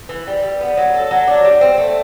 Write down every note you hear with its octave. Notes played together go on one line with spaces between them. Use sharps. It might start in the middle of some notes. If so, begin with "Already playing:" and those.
E3
G3
G3
B3
F#3
A4
F#3
D4
G3
C4
A3